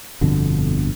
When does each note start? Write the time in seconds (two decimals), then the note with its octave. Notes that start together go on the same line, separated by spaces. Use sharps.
0.21 G1 F2 B2 D3